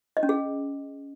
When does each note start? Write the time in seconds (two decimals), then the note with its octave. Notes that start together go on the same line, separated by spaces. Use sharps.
0.17 D#5
0.23 C#4
0.29 G#4